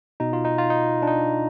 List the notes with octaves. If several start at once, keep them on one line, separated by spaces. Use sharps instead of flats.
B2 D#4
F4
D#4
F4
D#4
D4
D#4